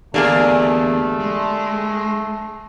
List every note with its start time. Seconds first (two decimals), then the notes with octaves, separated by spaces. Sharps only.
0.14 E2 D3 A3 A#3 D4 G4 G#4
1.20 G#3